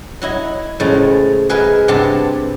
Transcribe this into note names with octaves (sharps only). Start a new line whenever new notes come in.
F#3 E4 D#5
A2 C#3 F3 G#3
G#4 A#4 B4 D#5 E5
G2 C3 B3 G4 A5 C6